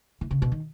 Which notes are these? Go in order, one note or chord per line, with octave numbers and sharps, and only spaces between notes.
E3
C#3
B2
D#3